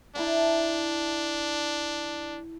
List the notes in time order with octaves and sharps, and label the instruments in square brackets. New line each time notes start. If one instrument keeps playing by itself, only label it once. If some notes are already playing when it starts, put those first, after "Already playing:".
[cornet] D4 [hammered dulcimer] E4 A5 A#5